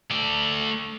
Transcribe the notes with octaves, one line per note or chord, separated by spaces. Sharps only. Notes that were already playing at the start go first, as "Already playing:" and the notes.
A3 D5